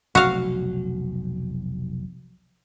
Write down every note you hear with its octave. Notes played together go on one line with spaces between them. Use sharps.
F1 B1 F#4 F5